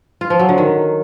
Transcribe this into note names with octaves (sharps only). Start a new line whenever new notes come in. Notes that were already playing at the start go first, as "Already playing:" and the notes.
F4
F3
F#3
D3
D#3